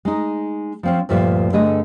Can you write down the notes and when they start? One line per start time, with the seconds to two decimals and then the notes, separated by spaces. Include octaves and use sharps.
0.05 G#3 D#4
0.83 F3 C4 C#4
1.09 D2 G2 A#2 F3 E5
1.52 G2 D3 A3 G#4 D#5